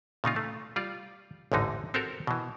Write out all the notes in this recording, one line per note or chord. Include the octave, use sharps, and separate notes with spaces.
A#2 C#3 D#4 F4
A3
G3 F4 D5
A1 E2 G#2 D3 D#4
C4 F#4 G4 A4 A#4
B2 E3